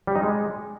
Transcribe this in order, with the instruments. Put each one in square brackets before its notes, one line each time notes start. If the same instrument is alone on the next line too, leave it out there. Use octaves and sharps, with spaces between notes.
[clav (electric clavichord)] G3
D#4
G#3